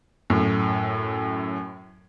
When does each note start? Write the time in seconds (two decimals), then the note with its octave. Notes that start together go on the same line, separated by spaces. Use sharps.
0.30 F#2 A2